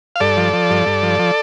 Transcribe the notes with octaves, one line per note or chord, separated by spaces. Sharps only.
F5
G2 A4 D5
F3
F3
G2
G2
F3
F3